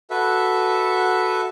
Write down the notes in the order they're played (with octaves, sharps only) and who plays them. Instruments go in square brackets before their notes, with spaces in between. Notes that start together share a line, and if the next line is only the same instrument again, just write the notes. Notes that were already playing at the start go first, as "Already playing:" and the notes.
[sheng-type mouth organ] F#4 A4 B4 E5